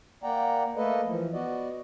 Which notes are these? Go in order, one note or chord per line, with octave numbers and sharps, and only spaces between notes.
A#3 D5 F#5 G5 A#5
A3 A#3 A4 B4 D#5
E3 F3
B3 F#4 D5 D#5